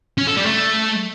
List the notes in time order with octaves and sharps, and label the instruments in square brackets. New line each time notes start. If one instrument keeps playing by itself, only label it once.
[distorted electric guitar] C#4
A4
G3
A3